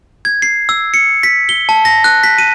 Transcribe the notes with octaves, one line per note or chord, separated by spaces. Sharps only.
G#6
C7
E6
C#7
B6
G7
A5
A#6
F#6
B6
D#7